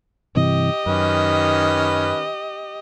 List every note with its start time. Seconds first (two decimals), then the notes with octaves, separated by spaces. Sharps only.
0.36 G2 C3 E3 G4 D#5
0.86 F#2 D#3 C#4 B4